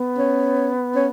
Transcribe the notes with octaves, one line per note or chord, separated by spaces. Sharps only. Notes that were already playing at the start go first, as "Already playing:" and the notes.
Already playing: B3
C#4
C#4